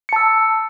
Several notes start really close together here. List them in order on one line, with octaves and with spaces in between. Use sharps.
C#7 A5 E6